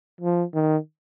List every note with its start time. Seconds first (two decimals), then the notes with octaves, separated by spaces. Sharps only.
0.21 F3
0.54 D#3